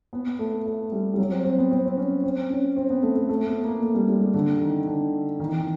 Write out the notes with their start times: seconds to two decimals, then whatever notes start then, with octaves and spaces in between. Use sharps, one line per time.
0.13 B3
0.39 A3
0.66 A3
0.92 G3
1.14 G3
1.18 F#3
1.31 C4
1.45 C4
1.58 B3
1.71 C4
1.86 C4
1.97 C#4
2.24 C4
2.50 C#4
2.76 C4
2.90 B3
3.02 A3
3.16 A3
3.29 A3
3.47 B3
3.64 A#3
3.82 A3
3.95 G3
4.09 G3
4.21 G#3
4.34 D3
4.61 D#3
4.87 D3
5.40 D#3
5.46 E3
5.54 D#3